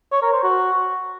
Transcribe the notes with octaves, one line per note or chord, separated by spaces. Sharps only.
C#5
A#4
C5
F#4